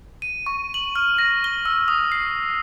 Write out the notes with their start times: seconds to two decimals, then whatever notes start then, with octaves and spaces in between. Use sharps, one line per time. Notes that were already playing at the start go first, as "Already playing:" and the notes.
0.22 D#7
0.46 C#6
0.74 F#7
0.96 F6
1.18 A#6
1.44 G7
1.65 E6
1.88 D#6
2.12 C7